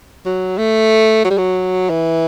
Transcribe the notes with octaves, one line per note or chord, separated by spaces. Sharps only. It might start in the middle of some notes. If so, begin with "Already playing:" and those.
F#3
A3
F#3
G3
F#3
E3